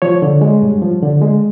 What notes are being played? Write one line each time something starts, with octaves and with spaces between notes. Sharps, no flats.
F3 C#5
D3
G#3
G2
F3
D3
G#3